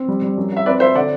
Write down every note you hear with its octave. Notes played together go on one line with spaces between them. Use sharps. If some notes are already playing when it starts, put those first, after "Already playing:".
Already playing: C4
G3
G3
F#2
F#3 E5
C4 B4 D5
F#3 C5 E5
D3 D5 F#5